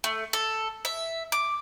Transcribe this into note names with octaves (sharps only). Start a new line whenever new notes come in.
A3
A4
E5
D6